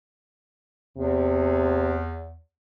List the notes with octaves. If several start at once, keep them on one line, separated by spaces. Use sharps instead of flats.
E2 C3